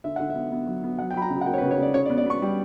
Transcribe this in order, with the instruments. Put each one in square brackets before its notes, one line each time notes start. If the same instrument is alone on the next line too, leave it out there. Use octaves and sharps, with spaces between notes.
[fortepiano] D3 E5
D3 F#5
E5
B3
B3
F#3
B3
F#3 F#5
G5
F#3 B5
A#5
C#3
F#5
A#3 G5
C#5
B4
C#3
C#5
C#3 D5
C#3 C#5
D5
B3
D5
B3 C#6
G3